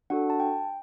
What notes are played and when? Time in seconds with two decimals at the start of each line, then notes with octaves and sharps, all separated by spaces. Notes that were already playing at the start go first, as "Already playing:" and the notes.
0.10 D4 F#4 A4 F#5
0.30 A5
0.40 G5